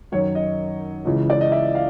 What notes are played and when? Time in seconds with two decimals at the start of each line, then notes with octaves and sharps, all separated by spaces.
0.12 F#2 D#3 C#5
0.35 D#5
1.05 C#2 C#3 E3
1.30 D5
1.41 D#5
1.52 E5
1.75 F5